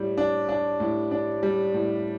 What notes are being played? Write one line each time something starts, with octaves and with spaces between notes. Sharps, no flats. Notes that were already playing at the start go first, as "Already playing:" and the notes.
Already playing: A2 G3
D4
D4
A2
D4
G3
A2